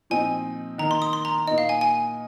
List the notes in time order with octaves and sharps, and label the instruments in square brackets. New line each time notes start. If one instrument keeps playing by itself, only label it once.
[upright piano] A#2 F3 C4 D#4 [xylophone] G#5
[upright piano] D#3 A#3 D#4 [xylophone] A#5
[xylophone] C6
D#6
C6
A#5
[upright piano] A#2 A#3 D#4 [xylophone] D#5
[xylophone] F5
G#5
G#5